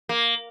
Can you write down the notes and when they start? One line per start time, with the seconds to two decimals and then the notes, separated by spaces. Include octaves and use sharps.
0.09 A#3